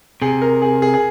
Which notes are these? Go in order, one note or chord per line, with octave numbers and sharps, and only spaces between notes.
C3 G#4
A#4
G#4
G#4
G#4